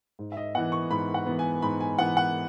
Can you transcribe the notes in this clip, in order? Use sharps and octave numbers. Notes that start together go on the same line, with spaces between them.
G#2
E5
D#5
E3 B3 F#5
C#6
G#2 B5
F#5
E3 B3
G#5
G#2 B5
G#5
E3 B3 F#5
F#5